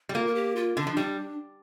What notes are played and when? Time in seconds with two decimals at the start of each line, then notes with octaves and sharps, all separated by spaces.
0.09 G3
0.14 A#3 F4
0.26 A#4
0.35 G4
0.56 F4
0.76 D3 D4
0.87 F3
0.97 G3 D4